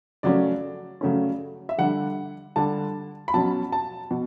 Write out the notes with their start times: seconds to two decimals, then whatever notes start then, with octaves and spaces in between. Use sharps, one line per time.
0.23 C#3 F#3 A3 C#4 D5
1.01 C#3 F#3 A3 C#4
1.69 E5
1.78 D3 G3 D4 F#5
2.56 D3 G3 D4 A5
3.28 B5
3.34 B2 F#3 C#4 A5
3.72 A5
4.11 B2